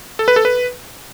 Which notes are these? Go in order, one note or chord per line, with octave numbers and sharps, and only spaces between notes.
A4
B4
A4
B4